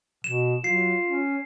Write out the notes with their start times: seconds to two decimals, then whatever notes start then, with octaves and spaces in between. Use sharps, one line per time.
0.24 B2 E7
0.64 F#3 F4 C7
1.07 C#4